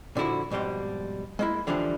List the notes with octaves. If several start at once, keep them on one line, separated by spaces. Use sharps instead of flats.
A#2 D3 F3 E4 F#4
F2 G#2 B2 G3 C6
G#3 A#3 E4
D3 E3 F3 G3 D4